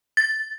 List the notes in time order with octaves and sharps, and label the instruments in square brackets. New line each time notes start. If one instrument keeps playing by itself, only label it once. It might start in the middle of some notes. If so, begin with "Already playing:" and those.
[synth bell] A6